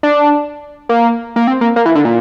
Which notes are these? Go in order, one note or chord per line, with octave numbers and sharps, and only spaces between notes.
D4
A#3
A#3
C4
A#3
A#3
E3
D3
A#2